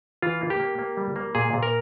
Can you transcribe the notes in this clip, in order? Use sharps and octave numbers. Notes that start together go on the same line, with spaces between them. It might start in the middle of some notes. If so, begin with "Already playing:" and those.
E3 F4
A#3
G4
A#3
A#3
G3
A#3
A#2 G#4
A#2
A#4